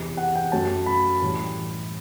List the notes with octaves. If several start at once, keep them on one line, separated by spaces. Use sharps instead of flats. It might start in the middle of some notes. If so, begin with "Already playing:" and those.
Already playing: E2 C3 E3
F#5
G5
F#2 F#3 A3 A5
B5
A2 E3 G3